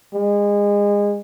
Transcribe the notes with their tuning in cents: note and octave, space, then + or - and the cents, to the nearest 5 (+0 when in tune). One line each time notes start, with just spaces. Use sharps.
G#3 -25